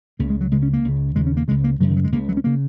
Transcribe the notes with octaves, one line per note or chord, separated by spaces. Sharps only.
C#2 C#3 A#3
G#3
F#3
C#2 C#3 G#3
C#4
A#3
C#2 C#3
D#2 C#3 G#3
C#4
A#3
C#2 C#3 G#3
A#3
F#2 C#3 F#3
D#3
F#3
G#3
C#2 C#3 A#3
F#3
C#4
C#3 A#3